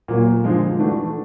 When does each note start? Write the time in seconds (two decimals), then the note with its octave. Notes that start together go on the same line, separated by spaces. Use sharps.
0.08 A#2 F#3 A#3
0.44 D3 F3 G#3
0.79 E3 A3 D4 F#4